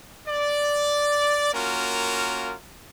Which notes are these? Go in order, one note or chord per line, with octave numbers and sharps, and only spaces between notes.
D5
A#3 C#4 F4 F#4 A#4